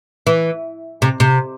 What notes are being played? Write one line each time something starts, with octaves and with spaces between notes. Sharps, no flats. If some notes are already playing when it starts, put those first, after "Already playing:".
E3
C3
C3